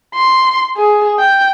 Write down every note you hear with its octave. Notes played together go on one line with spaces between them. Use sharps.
C6
G#4
G5